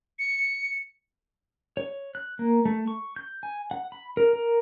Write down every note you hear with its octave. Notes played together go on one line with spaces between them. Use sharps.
C#7
C#5
F#6
A#3
A3
C#6
G6
G#5
F#5
B5
A#4
A#4